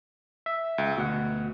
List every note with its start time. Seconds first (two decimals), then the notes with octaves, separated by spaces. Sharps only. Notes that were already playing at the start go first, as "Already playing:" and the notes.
0.46 E5
0.78 C#2
0.97 D2 B2 F#5